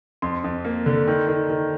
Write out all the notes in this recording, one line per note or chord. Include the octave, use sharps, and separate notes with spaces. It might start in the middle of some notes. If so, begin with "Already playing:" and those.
F2 C6
F2
A#3
D3
D#3
D#3
D#3